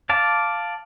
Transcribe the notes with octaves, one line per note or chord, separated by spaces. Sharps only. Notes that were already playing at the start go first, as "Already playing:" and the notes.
D5 F5 A5